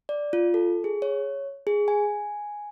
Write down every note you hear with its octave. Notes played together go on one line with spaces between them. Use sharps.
D5
F4
A4
G#4
C#5
G#4
G#5